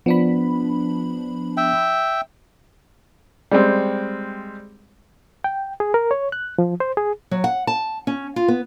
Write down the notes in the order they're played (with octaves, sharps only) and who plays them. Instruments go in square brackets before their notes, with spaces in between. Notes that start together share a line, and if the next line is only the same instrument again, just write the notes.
[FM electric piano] F3 D4 B5 [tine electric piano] B3
[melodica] E5 G5
[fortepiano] G3 G#3 C4
[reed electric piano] G5
G#4
A#4
C#5
F#6
F3
C5
G#4
[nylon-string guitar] F#3
F#5
A5
C#4
F4
B3